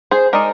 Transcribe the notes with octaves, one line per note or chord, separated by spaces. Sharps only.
G#4 C5
G#3 D#4 A#4 D5